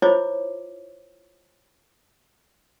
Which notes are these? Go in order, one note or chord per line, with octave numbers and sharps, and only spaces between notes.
E4 F4 C5 C#5 D#5 D6